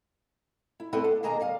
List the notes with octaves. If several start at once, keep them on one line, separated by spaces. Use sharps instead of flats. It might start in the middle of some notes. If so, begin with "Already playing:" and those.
E4
A3 B3 C4 E4 A4 B4
D4
B2 D#3 A#3 G#4 A#4 A#5
D2 G3 F5